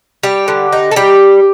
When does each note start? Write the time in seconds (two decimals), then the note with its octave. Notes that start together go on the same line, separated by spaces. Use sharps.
0.23 G3 G4
0.48 D3
0.73 D#4
0.91 A4
0.96 G3 G4